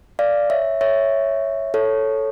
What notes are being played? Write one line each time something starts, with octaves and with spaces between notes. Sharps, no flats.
D5 F5
C#5 E5
C#5 E5
A4 C#5